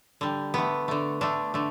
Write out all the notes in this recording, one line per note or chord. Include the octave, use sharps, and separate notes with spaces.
D3 G3
D3 A3 B3
D3 A3
D3 A3 D4
D3 A3